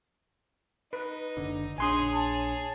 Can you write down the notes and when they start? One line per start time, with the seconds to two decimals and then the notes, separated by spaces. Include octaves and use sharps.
0.93 D#4 B4
1.37 F#1 D3
1.78 A#1 D4 G#4 C#5 G#5 C6 D#6
2.14 A5